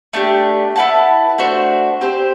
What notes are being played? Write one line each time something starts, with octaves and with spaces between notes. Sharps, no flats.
A3 D4 G4
E4 B4 F#5 A5
A3 D4 F#4 C5
C4 G4 C5